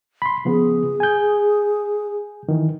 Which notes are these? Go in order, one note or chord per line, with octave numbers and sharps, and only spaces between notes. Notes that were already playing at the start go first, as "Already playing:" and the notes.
B5 C6
C#3 F3 B3 G#4
G#5 G6
D#3 E3